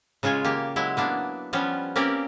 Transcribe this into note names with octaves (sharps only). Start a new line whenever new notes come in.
C#3 G#3 F4 G#4 C#5
A#3 G4
F#3 G#3 E4
A#3 B3 D4
F3 G3 B3 C#4 F4
A#3 C4 C#4 G4 A#4 D5